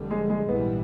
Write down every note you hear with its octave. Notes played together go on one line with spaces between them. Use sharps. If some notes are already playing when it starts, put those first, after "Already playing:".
Already playing: F1 F2 D3 G3
G#3
G#3
A#1 G#2 E3 G3 B3